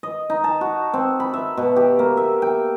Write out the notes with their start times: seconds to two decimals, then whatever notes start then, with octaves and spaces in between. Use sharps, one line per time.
0.03 D#5
0.30 D#4
0.44 A5
0.61 F#4
0.94 C4
1.20 B5
1.34 E5
1.57 B2
1.76 G4
1.99 A#3
2.17 E5
2.42 G5